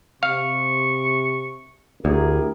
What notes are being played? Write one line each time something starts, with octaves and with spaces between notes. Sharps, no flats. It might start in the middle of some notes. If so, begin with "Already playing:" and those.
C3 F5 C#6
D2 E4 G4 G#4 A#4